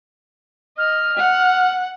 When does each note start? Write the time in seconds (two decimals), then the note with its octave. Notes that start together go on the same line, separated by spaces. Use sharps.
0.78 D#5 F6
1.17 F#5